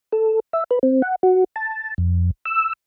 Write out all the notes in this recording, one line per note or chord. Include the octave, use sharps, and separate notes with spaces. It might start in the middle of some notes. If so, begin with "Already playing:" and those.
A4
E5
B4
C4
F#5
F#4
A5
F2
E6